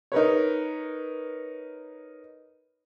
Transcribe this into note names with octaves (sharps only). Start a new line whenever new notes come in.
D#4 A#4 B4 C#5